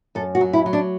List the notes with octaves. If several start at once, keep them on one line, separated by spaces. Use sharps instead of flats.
F#2 A4
F#4
F#3
E4
F#3
D4